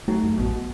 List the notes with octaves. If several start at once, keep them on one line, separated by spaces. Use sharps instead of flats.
F#3 A3
F#2
A1 B2